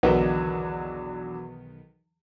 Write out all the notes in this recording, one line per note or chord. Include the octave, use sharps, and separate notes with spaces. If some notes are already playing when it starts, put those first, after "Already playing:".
B1 E2 D3 D#3 F#3 B3